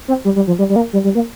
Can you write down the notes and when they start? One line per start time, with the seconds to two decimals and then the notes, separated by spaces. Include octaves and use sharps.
0.08 C4
0.25 G3
0.36 G3
0.47 F3
0.59 G3
0.69 G3
0.76 A#3
0.93 G3
1.04 G3
1.15 A#3